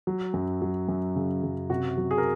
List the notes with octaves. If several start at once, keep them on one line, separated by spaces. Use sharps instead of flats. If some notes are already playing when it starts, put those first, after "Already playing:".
F#3
F#2
F#3
F#2
C#3
F#2
C3 F#4
F#3
G#4
A#4